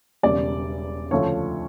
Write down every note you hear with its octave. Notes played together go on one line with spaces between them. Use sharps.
E1 E2 C#3 G3 D5
D2 C#3 F3 A3 C#5